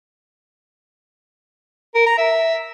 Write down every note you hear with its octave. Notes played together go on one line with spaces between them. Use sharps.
A#4
A#5
E5